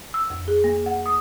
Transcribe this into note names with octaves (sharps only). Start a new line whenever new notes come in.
E6
F2
G#4
A#3
F#5
D#6